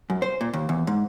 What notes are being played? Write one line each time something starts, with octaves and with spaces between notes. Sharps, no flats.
F#2
C5
A#2
D#2
E2
G#2